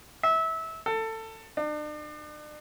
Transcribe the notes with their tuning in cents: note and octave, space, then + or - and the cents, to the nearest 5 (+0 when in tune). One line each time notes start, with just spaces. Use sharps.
E5 -25
A4 +20
D4 +40